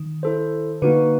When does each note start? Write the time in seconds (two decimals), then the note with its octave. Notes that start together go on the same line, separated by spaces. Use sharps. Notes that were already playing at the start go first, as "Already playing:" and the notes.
Already playing: D#3
0.23 E4 A4 C5
0.82 D3 A#3 D#4 F#4 B4